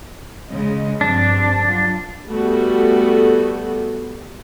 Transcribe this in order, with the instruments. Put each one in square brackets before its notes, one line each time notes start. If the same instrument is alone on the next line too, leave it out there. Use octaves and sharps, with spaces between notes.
[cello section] C#3 G#3 D#5
[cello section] G2 F3 C4 [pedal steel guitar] D4
[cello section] F#3 F4
[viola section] G3 A3 B3 F#4